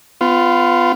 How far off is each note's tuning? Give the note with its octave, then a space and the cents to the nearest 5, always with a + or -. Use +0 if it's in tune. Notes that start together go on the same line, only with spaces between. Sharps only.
B3 +25 F4 +0